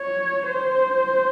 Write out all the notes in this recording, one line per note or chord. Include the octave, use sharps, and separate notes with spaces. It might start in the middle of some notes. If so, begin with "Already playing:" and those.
Already playing: C#5
C5